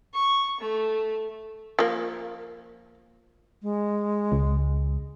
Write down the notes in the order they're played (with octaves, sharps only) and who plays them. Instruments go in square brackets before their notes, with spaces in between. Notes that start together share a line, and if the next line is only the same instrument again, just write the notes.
[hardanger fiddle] C#6
A3
[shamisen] F3 A#3
[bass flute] G#3
[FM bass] C#2